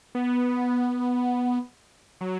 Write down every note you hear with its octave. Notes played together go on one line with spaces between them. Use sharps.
B3
F#3